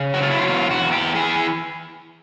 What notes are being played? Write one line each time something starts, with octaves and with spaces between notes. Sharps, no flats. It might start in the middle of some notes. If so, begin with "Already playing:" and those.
Already playing: C#3
F#3 F#4
F4
E4
F4
E2 F4
F#4
E2
G4
E3 G#4